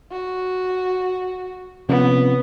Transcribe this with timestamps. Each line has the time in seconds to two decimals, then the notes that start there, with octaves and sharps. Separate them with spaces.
0.11 F#4
1.89 C3 F3 B3 C#4